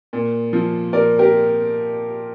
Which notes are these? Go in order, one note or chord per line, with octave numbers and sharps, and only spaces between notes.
A#2
F3
A#2 A#4 D5
G4 A#4